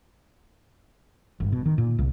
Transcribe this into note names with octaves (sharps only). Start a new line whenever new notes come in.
G1
B2
D#3
A#2
C2